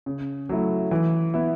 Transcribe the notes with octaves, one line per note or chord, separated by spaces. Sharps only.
C#3
F#3 A3 E4
E3
B3 E4